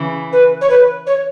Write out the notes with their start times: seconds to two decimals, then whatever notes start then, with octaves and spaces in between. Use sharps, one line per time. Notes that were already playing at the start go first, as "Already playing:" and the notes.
Already playing: C#3 E3
0.33 B4
0.61 C#5
0.69 B4
1.06 C#5